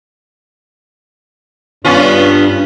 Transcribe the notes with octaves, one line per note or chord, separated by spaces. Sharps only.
G2 B3 C#4 F4